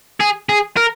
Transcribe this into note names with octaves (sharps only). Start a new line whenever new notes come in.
G#4
G#4
A#4